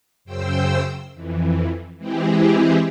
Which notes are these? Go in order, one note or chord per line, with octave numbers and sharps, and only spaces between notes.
F#2 C#3 C5 G5 E6
F2 E3
E3 G#3 C4 E4 G4 G#4